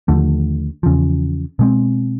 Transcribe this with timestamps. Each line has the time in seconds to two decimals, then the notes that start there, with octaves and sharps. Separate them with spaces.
0.08 D#2 D3 F3 A3
0.83 E2 C#3 F3
1.59 B2 G#3 C4